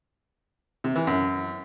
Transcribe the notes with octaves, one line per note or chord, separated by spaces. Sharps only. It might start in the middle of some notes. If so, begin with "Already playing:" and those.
C3
E3
F#2